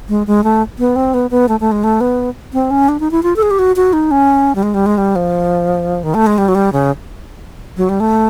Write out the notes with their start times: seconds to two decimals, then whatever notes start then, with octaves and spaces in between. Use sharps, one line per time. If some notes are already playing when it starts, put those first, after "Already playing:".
0.09 G#3
0.27 G#3
0.44 A3
0.79 B3
0.96 C4
1.14 B3
1.31 B3
1.48 A3
1.60 A3
1.72 G#3
1.84 A3
2.01 B3
2.53 C4
2.71 C#4
2.89 D4
3.00 D#4
3.11 E4
3.23 F4
3.36 A4
3.43 G#4
3.51 G4
3.59 F#4
3.76 F#4
3.93 D#4
4.11 C#4
4.55 G3
4.63 G#3
4.74 G3
4.86 G#3
4.98 G3
5.16 F3
6.03 D#3
6.14 A3
6.27 G#3
6.38 G3
6.48 F#3
6.55 G3
6.73 C#3
7.77 F#3
7.89 G3
8.00 A3